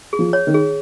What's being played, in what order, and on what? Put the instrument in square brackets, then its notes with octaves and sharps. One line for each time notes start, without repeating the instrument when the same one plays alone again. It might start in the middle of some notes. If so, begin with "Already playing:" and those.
[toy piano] G#4
[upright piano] F3
[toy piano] C#5
[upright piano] D#3
[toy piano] G#4